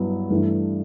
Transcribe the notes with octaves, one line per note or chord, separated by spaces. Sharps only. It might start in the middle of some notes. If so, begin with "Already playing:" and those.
Already playing: G2 F#3 B3 E4
G2 E3 A3 D4